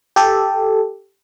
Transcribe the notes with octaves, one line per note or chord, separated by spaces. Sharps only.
G4 A4